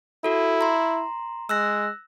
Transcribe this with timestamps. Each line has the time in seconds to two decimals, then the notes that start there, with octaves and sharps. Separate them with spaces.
0.24 E4 F#4 A4
0.61 A#5 C6
1.49 G#3 E6 F#6 A#6